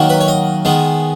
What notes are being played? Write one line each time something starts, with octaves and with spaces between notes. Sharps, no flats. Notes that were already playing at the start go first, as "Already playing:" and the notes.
Already playing: D#3 F#3 A#3
B4
C#5
D#5
D#3 G#3 B3